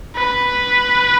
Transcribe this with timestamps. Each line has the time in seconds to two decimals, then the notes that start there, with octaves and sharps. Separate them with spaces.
0.16 B4